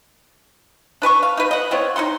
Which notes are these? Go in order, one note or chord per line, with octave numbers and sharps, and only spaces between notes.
D4 B4 A5 C#6
F5
D#4 B4
D#5 F#5
B3 C4 F4 C#5
D#4 F#4 F#5 C6